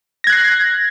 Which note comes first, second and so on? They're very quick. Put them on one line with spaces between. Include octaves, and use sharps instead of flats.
A#6 G#6 F#6 C7